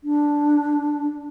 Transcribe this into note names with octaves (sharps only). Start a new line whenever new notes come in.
D4